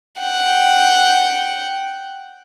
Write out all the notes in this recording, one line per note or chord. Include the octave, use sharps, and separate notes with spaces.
F#5 G5